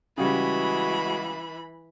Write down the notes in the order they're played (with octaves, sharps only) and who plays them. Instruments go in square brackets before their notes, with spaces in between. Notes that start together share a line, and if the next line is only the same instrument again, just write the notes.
[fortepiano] C#3 G3 [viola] E3 B5 [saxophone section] G#3 F#4